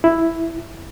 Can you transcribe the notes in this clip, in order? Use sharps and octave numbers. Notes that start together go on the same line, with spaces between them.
E4